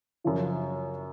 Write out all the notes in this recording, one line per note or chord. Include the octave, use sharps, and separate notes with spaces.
F#2 C#3 F3